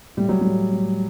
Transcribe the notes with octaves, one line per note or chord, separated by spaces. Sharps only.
A2 G3
F#3
A2 G3
A2